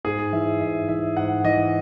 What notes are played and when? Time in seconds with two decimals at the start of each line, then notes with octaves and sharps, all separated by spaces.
0.04 G#2 G#4
0.33 E3 E5
0.61 G#2 E5
0.88 E3 E5
1.16 G#2 F#5
1.44 E3 D#5